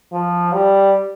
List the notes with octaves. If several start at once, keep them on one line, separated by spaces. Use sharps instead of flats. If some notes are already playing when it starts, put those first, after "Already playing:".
F3
G3